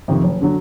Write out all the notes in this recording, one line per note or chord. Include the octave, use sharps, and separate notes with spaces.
F2 C3 D#3
F#1
D3 F#3